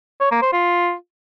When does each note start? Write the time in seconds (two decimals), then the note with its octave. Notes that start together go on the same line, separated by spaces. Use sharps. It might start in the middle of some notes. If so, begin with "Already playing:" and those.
0.21 C#5
0.31 A#3
0.42 C5
0.53 F4